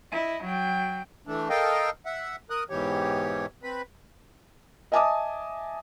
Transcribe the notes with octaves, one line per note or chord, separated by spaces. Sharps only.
E4 D#5
F#3 G5
E3 A3 D4
A4 A#4 D#5 F5 G5
E5 F#5
A#4 D#6 F#6
G#2 B2 E3 G4 C#5
C4 B4 B5
D#5 E5 G#5 A5 D6 D#6